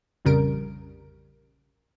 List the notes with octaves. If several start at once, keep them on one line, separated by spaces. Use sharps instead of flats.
A#1 F2 C#3 G3 A#4 D7